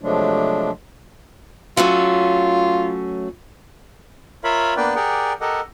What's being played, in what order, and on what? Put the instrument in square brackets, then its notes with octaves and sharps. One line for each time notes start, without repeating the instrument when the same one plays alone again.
[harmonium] C3 F3 F#3 G#3 A3 D4
[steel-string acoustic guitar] F#3 A3 C#4 [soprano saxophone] F4
[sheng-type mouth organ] F4 A#4 C#5 E5 F5 B5
A#3 B3 D4 B4 D5 G5
G4 G#4 A#4 D5 F#5 G5
G4 A4 A#4 D#5 F#5